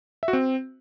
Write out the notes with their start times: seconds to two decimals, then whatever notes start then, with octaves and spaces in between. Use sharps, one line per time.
0.23 E5
0.28 F#4
0.33 C4